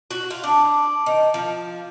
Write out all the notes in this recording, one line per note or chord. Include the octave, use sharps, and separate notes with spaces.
F#4
F4
D4
D#3
F3